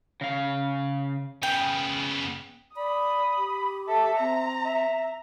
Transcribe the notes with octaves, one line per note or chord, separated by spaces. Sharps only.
C#3 F5
C#3 B3 G5
D5 B5 D#6
G4
A4 E5
C4 A#5
E5